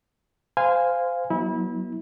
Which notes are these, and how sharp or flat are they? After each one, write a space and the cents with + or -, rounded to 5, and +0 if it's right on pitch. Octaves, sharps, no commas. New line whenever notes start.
C5 -20 F5 +0 G#5 -15
F#3 +0 B3 -40 E4 -30